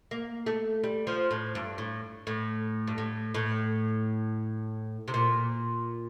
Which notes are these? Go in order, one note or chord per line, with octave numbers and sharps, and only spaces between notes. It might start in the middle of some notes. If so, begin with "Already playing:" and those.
A#3
A3
G3
F3
A2
G2
A2
A2
G2
A2
A2
C3
A#2